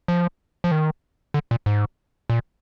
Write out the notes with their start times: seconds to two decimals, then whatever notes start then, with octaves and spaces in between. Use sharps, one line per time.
0.08 F3
0.64 F3
0.71 D#3
1.34 D3
1.51 A#2
1.66 G#2
2.30 A#2